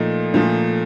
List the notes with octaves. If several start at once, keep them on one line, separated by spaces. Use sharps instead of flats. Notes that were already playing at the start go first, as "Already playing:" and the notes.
Already playing: A#2 F3 A3 D#4
A#2 F3 A3